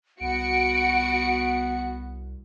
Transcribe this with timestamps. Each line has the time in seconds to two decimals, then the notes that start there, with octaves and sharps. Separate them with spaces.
0.21 C2 B3 F#4 C#7 D7